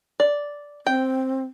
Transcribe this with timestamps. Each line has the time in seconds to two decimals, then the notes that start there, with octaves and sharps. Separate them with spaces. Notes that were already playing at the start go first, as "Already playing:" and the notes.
0.20 D5
0.86 C4 G5